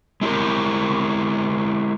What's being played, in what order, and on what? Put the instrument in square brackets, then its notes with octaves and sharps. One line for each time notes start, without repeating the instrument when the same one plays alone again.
[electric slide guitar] G#3 E4 G4 A#4